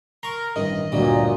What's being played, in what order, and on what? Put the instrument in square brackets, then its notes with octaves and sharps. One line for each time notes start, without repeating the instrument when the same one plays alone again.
[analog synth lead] A#4 [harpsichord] C6 C#6
[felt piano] A1 G2 [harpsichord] D#3 [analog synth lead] D#5
[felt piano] G1 D2 G2 [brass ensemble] A#2 [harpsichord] F#3 G3